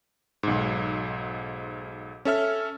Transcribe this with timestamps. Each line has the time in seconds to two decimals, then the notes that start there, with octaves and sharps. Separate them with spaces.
0.43 B1 G#2
2.25 C#4 A4 E5 F6